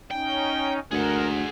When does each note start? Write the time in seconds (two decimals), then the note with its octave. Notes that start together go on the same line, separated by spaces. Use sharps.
0.11 C#4 D#4 G5
0.91 D2 G#4 A#4 F#5